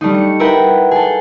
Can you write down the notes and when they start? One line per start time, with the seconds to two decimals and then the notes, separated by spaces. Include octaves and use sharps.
0.01 G3 A3 D4 D#4
0.14 C#7
0.39 E4 A#4 B4 F#5 G5
0.91 G#4 A4